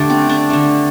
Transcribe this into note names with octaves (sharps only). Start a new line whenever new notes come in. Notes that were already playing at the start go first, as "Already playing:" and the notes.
Already playing: D3 A3 D4 G4
C4
D4
D3 A3